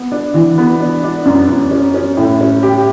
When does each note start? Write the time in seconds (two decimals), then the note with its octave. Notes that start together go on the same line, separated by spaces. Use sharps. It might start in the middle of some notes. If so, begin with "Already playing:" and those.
Already playing: B3
0.12 D4
0.34 E3
0.58 B3
0.80 D4
1.03 D4
1.25 F#2
1.49 F#2
1.71 C#4
1.94 C#4
2.17 A2
2.41 C#4
2.63 G4